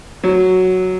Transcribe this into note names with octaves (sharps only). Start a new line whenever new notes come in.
F#3